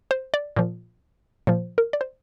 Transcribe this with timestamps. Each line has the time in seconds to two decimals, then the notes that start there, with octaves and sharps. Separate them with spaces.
0.11 C5
0.34 D5
0.56 A#2 F3
1.47 A#2 F3 C5
1.78 A#4
1.93 D5
2.01 C5